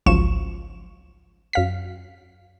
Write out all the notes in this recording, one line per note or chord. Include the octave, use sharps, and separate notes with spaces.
G#1 C#2 F3 F#3 C#6 E7
F#2 F5 B6